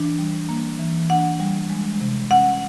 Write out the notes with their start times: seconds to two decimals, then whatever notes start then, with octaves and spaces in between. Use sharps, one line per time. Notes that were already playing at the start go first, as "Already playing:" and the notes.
Already playing: E3 D4
0.19 G3
0.49 A#3
0.79 E3
1.10 D4 F#5
1.40 G3
1.70 G#3
2.01 C3
2.31 C#4 F#5